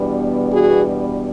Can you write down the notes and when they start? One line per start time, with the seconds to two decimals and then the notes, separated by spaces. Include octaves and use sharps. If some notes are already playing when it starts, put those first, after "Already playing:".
Already playing: E2 B2 G3 B3 D4
0.52 F#4 G#4